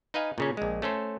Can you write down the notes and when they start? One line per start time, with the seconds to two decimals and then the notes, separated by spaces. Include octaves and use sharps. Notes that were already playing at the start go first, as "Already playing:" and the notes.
0.14 D#4 B4 D#5 F5 G#5
0.38 A#2 C#3 C#4
0.57 A#1 G#3
0.82 A3 C#4 A4 C5